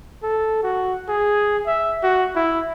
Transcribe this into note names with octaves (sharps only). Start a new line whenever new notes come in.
A4
F#4
G#4
E5
F#4
E4